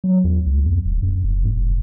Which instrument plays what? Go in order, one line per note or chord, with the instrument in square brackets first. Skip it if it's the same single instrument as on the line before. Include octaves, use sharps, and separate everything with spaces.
[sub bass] F#3
E2
C#2
F2
D#1
F#2
F1
G#2
F1